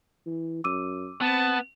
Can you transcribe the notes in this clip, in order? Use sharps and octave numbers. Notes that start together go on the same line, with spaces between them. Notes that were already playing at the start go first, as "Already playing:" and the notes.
E3
F#2 D6 E6 D#7
B3 C4 A5